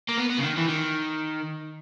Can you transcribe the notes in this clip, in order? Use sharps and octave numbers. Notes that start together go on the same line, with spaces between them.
A#3
B3
B3
C#3
D#3
E3
D#3